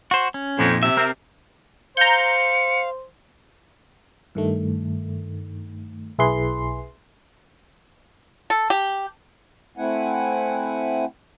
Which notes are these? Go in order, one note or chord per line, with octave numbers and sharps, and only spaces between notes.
F#4 C5
C#4
F2 A#2 F3 D#4
C3 E5
C4 A#4
C5 F5 A#5 G6 C#7
G2 D#3 A3
B1 E4 G#4 B4 C6
A4
G4
A3 C4 E4 F#5 G#5